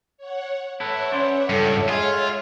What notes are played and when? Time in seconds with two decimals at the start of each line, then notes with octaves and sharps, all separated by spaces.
0.18 C#5 F#5
0.80 E4 A4 B4 C#5 E5 F#5
1.12 C#4 B4 C5 D5
1.50 C#2 G2 G3 A4
1.89 G#3 F4 G#4 G#5